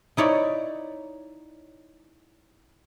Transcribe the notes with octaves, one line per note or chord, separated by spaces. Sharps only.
D#4 E4 C#5 D5